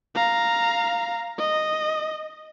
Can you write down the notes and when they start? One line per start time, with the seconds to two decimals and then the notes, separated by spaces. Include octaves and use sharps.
0.16 F5 A#5
1.38 D#5